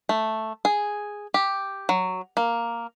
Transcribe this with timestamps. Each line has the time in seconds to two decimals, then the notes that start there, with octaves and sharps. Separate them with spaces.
0.09 A3
0.65 G#4
1.34 G4
1.89 F#3
2.37 A#3